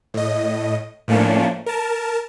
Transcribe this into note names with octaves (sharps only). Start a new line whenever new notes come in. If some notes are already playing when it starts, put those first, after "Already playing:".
A2 D#5
A2 F3 A3 A#3 C#4 D4
A#4 A5